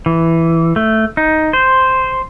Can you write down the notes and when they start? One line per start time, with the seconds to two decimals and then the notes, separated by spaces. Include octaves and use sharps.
0.06 E3
0.76 A3
1.17 D#4
1.53 C5